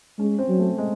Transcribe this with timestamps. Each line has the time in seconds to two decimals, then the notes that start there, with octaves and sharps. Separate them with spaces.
0.19 G#3 C#4
0.39 C4
0.49 F#3
0.59 A3
0.78 G#3